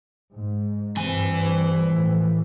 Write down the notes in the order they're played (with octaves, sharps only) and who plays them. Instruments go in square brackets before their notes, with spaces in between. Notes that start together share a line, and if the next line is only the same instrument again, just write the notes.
[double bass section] G#2
[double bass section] G2 G3 C4 [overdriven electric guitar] E3 G#5
[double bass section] A2 F3